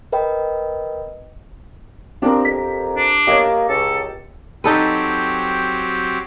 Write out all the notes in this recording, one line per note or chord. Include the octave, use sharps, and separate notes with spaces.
A#4 B4 D#5 G5 B5
F3 C4 D4 G4 A#4
F2 B6
D4
A#3 G4 C#5 D#5
C#2 A4
F#3 C4 D#4 G4 A4 B4